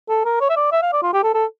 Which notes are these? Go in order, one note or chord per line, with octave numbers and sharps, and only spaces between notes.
A4
A#4
C#5
E5
D5
E5
F5
D5
F4
G4
A4
A4